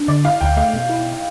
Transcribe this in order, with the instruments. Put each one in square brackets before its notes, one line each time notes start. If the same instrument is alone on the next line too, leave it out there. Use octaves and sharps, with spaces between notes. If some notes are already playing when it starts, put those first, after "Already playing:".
Already playing: [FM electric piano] D4
[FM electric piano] D3 [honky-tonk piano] D5
[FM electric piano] E4 [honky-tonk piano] F5
[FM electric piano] D2 [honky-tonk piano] G5
[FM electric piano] A3 [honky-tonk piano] F5
[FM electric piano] B2
E4